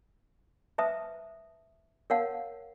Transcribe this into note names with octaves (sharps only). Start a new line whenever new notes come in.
B4 C5 E5 A5 D#6
A#4 C#5 F5 F#5 A5